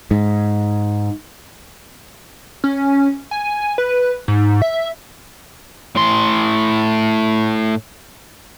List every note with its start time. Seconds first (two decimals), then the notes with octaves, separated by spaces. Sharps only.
0.11 G#2
2.64 C#4
3.31 G#5
3.78 B4
4.28 G#2
4.62 E5
5.96 A2 C6